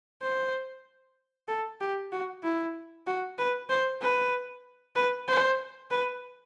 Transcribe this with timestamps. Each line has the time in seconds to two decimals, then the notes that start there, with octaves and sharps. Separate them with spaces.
0.22 C5
1.48 A4
1.81 G4
2.12 F#4
2.44 E4
3.07 F#4
3.38 B4
3.69 C5
4.02 B4
4.95 B4
5.28 C5
5.91 B4